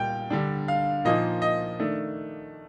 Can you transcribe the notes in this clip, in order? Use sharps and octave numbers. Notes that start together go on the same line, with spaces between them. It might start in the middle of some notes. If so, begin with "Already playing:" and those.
Already playing: A#2 G3 G5
D3 G3 D4
F5
A#2 F3 A#3 D#4 D#5
D#5
D#3 A3 D4